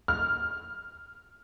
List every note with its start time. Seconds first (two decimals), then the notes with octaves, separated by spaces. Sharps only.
0.08 F6